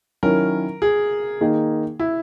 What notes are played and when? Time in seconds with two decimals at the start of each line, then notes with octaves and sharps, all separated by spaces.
0.23 D#3 F#3 C#4 E4 A#4
0.82 G#4
1.41 D#3 A#3 D#4 G#4
2.00 E4